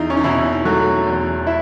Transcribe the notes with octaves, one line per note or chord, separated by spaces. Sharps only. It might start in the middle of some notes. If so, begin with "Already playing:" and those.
Already playing: E2 D#4
C#4
D#4
B2 E3 E4
F#3 A3 F#4
E2
E4 E5